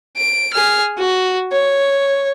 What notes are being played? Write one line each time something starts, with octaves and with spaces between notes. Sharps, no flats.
D7
G#4 F6
F#4
C#5